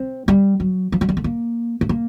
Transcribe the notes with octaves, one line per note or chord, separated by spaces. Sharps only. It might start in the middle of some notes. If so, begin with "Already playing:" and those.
Already playing: C4
G3
F#3
F3
F#3
G3
A3
A#3
A3
A#3